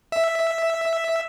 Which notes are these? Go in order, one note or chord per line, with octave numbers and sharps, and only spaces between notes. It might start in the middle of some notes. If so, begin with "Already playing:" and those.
E5